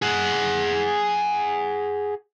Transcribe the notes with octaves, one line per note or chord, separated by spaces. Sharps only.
G#4 F#5